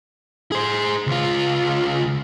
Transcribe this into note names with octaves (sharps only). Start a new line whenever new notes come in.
G#4 C5
C#2 F4